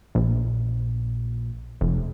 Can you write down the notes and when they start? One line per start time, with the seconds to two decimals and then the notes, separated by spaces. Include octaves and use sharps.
0.15 A#1
1.81 F1